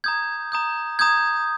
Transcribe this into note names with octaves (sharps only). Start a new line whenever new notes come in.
A#5 D#6 G6 G#6
A#5 D#6 G6
A#5 D#6 G6 G#6